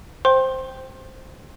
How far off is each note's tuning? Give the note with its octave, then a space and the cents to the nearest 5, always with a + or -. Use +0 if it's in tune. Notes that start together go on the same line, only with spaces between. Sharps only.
C5 +0 G5 +0 C6 +25